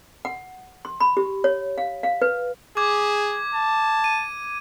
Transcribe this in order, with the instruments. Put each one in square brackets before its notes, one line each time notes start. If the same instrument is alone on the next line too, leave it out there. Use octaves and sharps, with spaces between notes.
[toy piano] F#5
C6
B5
G4
C#5
F5
F5
B4
[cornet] G#4 [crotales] D6 G#6
[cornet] A5
[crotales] D#7